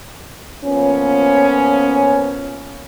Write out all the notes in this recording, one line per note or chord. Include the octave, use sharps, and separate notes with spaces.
F3 A#3 B3 C#4